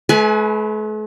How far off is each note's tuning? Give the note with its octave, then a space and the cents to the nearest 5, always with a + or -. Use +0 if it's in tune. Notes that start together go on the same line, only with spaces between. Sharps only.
A3 -45 B4 +0 G#5 +25